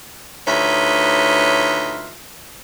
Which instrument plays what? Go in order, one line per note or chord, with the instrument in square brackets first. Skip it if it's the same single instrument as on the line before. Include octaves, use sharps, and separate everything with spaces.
[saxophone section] D2 D#4 F4 B4 C#5 E5